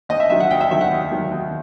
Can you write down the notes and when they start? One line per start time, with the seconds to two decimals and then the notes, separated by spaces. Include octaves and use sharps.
0.09 D#2 D#5
0.20 E5
0.30 D#3 F#3 E5
0.40 F#5
0.51 D#2 G5
0.61 E5
0.71 D#3 F#3 E5
0.81 F#5
0.91 D#2
1.11 D#3 F#3
1.31 D#2